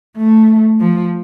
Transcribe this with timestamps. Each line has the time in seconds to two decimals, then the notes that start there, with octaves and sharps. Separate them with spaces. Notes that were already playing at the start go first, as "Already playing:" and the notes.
0.17 A3
0.80 F3